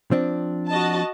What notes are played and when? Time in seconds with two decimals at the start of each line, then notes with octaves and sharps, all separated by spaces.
0.11 F3 C4 D4
0.69 F#4 D#5 A5